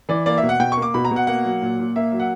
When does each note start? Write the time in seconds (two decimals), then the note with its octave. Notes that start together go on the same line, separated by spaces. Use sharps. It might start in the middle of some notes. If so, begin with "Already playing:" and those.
0.09 E3 D5
0.26 A#3 D5
0.38 E5
0.43 B2
0.49 F#5
0.59 B2 G5
0.72 A#3 C#6
0.82 D6
0.94 B2 B5
1.05 A#5
1.11 B2
1.16 F#5
1.27 A#3 F#5
1.45 F#3
1.62 A#2
1.79 A#2
1.96 A#3 E5
2.12 F#3
2.20 F#5